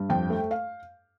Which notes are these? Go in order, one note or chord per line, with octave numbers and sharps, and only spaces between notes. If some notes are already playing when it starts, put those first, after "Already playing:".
Already playing: G2
F2 G5
A3
F5